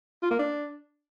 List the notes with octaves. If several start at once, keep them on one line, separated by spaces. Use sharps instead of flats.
F4
A#3
D4